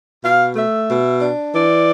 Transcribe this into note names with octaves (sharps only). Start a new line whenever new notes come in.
B2 F5
A3 E5
B2
D4
E3 D5